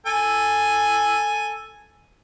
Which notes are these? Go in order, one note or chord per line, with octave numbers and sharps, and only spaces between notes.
A4 G#5